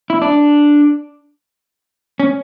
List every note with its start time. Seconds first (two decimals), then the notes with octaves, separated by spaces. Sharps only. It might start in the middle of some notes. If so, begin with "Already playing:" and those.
0.10 E4
0.22 D4
2.20 C#4